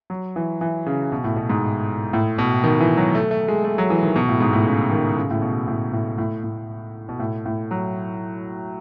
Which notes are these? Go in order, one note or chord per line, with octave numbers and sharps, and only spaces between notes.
F#3
E3
E3
C#3
B2
A2
B2
G#2
A2
B2
D#3
E3
F#3
A3
A3
G#3
A3
F#3
E3
D#3
B2
A2
G#2
A2
C#3
D#3
C#3
A2
B2
A2
A2
A2
A2
B2
A2
A2
F#3